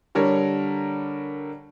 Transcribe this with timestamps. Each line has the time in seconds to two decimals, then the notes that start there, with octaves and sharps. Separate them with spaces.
0.15 D3 G3 A#4 C#5